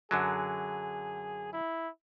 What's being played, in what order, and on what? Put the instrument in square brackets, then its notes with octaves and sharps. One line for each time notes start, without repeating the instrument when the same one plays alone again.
[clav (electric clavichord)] F#2 D3 F#3 [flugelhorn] G#4
[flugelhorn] E4